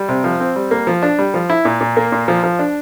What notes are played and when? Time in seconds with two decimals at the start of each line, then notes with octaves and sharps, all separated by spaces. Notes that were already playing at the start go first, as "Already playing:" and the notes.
Already playing: G3
0.09 C3
0.24 F3
0.40 C4
0.56 G3
0.71 A#3
0.87 F3
1.02 D4
1.19 G3
1.34 F3
1.50 E4
1.65 A#2
1.81 A#2
1.97 A#3
2.12 A#2
2.28 F3
2.44 F3
2.59 D4